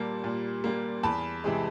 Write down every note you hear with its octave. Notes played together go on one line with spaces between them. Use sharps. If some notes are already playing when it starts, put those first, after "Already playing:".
Already playing: A#2 G3 A#3 A5
A#2
G3 A#3
E2 A5 B5
C3 E3 G#3